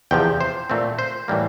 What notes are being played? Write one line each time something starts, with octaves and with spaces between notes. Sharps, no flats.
E2 C3 F3 G5
C5
A#2 A3 C4
C5
A2 E3 G3 A#3